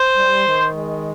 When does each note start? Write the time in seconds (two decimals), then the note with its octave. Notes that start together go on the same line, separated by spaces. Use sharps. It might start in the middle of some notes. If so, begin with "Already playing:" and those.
Already playing: C5
0.15 G3
0.44 D#3
0.72 G#3